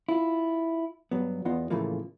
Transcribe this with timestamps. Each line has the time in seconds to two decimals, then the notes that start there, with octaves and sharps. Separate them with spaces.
0.09 E4 F4
1.11 G2 F#3 B3
1.45 E2 B3 F4 D#5
1.70 A2 C#3 E3 F3 A3 A#3